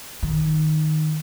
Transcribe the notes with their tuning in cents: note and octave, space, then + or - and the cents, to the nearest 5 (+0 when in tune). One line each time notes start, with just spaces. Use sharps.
D#3 -5